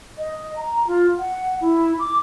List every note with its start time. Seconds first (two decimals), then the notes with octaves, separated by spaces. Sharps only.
0.18 D#5
0.56 A#5
0.87 F4
1.18 F#5
1.61 E4
1.99 D6